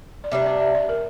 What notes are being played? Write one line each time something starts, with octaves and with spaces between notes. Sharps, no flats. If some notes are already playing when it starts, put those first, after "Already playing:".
D5
C3 G3 D4 E5
D5
E5
D5
A#4